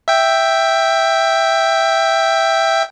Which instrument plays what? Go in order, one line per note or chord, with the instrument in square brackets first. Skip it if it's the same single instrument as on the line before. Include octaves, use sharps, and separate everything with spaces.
[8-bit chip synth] E5 G5